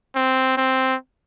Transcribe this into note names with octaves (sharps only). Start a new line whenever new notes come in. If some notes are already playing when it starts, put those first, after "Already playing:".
C4
C4